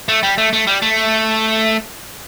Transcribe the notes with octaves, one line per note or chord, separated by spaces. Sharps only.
A3
G3
A3
A3
G3
A3